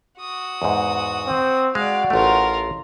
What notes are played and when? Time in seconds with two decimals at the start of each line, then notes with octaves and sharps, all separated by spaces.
0.19 F#4 D#6
0.62 E2 G#2
1.28 C4
1.75 G#3 F#4 D5 F5
2.10 A1 A3 F4 A#4